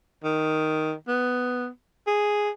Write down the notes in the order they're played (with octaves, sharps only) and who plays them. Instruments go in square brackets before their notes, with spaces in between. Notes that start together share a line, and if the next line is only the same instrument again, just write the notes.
[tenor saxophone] D#3
B3
G#4